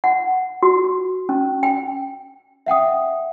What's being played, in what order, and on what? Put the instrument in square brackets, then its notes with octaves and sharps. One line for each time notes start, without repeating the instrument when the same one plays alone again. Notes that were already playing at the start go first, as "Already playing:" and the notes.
[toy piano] F#5
F#4
F#4
C#4
G5
[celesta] E5 F#5 G5 D#6